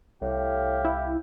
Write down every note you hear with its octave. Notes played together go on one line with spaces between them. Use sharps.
C2 A2 G4 F5
E4